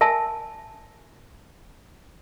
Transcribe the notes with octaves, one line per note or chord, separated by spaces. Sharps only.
A#4 E5 G#5 A5